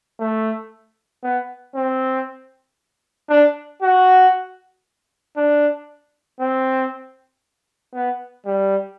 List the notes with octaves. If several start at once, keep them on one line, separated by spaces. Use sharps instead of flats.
A3
B3
C4
D4
F#4
D4
C4
B3
G3